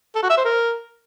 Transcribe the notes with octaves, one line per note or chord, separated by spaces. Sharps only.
A4
F#4
E5
C5
A#4